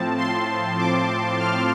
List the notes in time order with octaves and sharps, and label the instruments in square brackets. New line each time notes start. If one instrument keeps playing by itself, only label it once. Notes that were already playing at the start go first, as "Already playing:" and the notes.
Already playing: [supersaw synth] A2 F3 C4 A5
C6
D6
F6